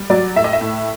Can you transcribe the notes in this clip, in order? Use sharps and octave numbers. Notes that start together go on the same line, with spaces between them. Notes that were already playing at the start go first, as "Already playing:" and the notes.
Already playing: G3
F#3 D5
A2 E5
D#5
E5
A2